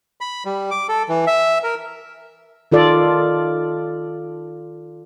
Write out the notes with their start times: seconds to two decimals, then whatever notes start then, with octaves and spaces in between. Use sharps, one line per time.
0.21 B5
0.45 G3
0.71 D6
0.89 A4
1.09 E3
1.27 E5
1.63 A#4
2.72 D#3 F4 A4 D5